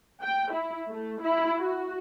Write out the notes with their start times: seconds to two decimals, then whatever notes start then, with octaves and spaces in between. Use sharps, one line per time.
0.23 G5
0.53 E4
0.90 A3
1.23 E4
1.58 F#4